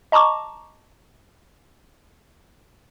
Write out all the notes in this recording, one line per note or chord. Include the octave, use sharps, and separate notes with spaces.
D#5 A5 A#5 C#6 D6